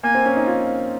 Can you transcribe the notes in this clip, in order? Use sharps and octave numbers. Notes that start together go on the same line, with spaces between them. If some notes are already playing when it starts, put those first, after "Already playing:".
A#3 G#5
C4
C#4
D#4
F4